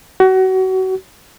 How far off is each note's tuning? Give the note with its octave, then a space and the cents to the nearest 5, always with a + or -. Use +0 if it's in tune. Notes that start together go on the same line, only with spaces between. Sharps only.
F#4 +30